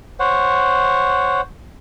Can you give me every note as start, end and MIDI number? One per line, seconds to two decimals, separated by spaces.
0.20 1.41 72
0.20 1.41 73
0.20 1.41 78